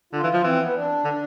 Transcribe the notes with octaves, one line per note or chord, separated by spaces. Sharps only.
D3 F4
E3
F3
E3 C4
B3
D4
D3